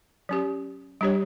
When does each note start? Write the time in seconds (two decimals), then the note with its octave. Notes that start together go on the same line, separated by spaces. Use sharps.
0.29 F#3 C#4 G4
1.01 G3 D4 G4 C#5